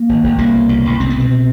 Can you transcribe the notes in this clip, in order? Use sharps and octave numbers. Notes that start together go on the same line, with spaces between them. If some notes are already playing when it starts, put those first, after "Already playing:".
Already playing: A#3
G#1
G#1
C2 A#3
B2
C2
C2
C2 C4
B3
B2 C4